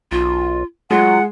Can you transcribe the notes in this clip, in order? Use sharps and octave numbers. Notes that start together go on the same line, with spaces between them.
B1 F4
F#3 G#3 F4 F#5